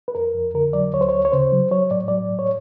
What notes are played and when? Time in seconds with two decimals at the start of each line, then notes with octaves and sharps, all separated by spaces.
0.08 B4
0.15 F2 A#4
0.35 F2
0.54 D3 A#4
0.73 F#3 D5
0.93 D2 C#5
1.01 C5
1.09 D2 C#5
1.25 C#5
1.32 C#3 C5
1.52 F#3
1.71 F#3 C#5
1.91 A2 D5
2.08 F#3 D5
2.30 A2
2.39 C#5